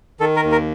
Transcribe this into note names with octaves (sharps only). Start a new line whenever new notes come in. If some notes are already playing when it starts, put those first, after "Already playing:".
D#3 A4
A#4
D#2
A#4